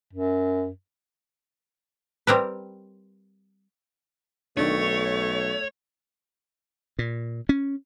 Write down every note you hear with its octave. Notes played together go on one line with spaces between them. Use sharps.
F#2
G3 C4 A#4 B4
B1 D#3 A3 D4 C#5
A#2
C#4